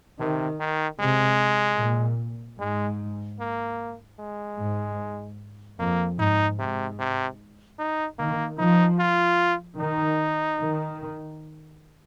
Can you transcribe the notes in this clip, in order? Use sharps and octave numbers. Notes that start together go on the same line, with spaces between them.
C3 D#3
D#3
C3 G#3
A#2
G#2 G#3
A#3
G#3
G#2
F2 A#3
G#2 D#4
G#2 C3
C3
D#4
D#3 A#3
F3 D#4
F4
D#3 D#4
D#3